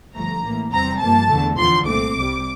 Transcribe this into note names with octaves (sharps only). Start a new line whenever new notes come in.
G1 G2 F3 A3 A#5
A1 A2 E3 A#3
E2 C3 G3 C4 A#5
G2 F3 A#3 A5
E2 D3 A3
E2 D3 F3 C6
C2 A#2 A3 C4 D6
C2 C3 G3